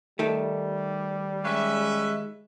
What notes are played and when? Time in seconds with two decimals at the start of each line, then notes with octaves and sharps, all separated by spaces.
0.19 D#3 G3 A3
1.45 G#3 C#4 B4 E5